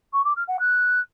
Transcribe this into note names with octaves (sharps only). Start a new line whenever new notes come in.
C#6
D6
F6
F#5
F#6